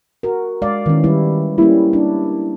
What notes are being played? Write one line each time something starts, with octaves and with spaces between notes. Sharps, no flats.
F#4 A#4
G#3 D5 F5
D#3 E3 C#4
G3 E4
G3 A#3 C#4 E4
D4